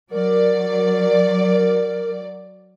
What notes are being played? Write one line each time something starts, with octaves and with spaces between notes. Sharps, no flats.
F#3 A#4 D5